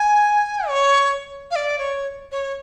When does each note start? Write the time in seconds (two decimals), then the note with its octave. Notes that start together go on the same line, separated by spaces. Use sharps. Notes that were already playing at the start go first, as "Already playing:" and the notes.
Already playing: G#5
0.68 C#5
1.51 F5
1.56 D5
1.78 C#5
2.32 C#5